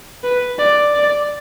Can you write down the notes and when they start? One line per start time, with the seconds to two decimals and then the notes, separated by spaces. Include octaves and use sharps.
0.24 B4
0.59 D5
0.95 D5